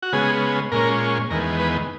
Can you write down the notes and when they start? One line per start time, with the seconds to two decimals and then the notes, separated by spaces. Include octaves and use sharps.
0.03 F#4
0.13 C#3 G#3 B3 G#4
0.72 A#2 G#3 C#4 A#4
1.30 E2 D#3 G#3 B3 A#4
1.59 B4